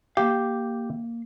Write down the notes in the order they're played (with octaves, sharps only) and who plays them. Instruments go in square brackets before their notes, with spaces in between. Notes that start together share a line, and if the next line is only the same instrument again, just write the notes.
[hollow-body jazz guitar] A#3 F5 [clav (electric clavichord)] G4